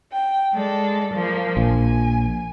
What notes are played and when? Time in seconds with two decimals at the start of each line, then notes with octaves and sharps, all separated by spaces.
0.12 G5
0.54 G#3 A4 D5
1.14 F3 A#3
1.57 A#1 G#5